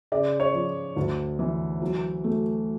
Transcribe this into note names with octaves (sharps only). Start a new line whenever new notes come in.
C#3 D5
C#5
F3
D2
E3
F#3
A3